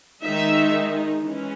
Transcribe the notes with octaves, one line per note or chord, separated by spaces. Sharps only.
D#3 G#3 D#4 E5
E3 G#3 C#4